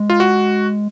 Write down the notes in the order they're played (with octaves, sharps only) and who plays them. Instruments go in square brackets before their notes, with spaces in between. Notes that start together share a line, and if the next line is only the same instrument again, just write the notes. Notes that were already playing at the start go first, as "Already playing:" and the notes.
Already playing: [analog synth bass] G#3
[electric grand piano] F4
F#4